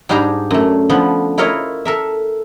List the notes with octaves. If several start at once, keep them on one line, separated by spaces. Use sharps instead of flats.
G#2 G3 D4 G4 G#4 A#5
F#2 A3
D3 F3 B3
E4 F4 A#4 C#5 D#5
A4 A#4 E5